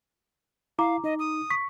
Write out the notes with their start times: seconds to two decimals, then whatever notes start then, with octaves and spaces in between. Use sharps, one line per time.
0.79 E4 F5 A#5 D6
1.04 D#4 D#5
1.19 D#6
1.50 C#6 B6